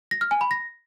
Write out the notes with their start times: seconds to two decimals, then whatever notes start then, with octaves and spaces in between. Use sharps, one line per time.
0.11 A#6
0.21 F6
0.31 G#5
0.41 B5
0.51 A#6